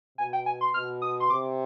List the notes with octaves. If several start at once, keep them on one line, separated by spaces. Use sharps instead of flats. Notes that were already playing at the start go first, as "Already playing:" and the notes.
B2 G#5
G5
G#5
C6
B2 F6
D#6
C6
C3 D6